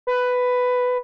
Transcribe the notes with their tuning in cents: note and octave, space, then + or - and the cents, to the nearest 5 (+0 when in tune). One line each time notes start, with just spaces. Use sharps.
B4 +10